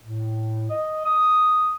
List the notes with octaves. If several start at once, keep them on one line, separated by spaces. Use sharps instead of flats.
A2
D#5
D#6